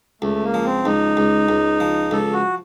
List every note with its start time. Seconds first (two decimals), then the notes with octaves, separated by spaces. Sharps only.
0.22 C#2 A3
0.43 A#3
0.54 F3
0.65 C4
0.85 C#2 D#4
1.17 C#2
1.49 C#2
1.80 F3
2.11 C#2 A4
2.33 F#4